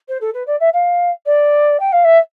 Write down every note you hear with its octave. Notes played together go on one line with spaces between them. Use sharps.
C5
A4
B4
D5
E5
F5
D5
G5
F5
E5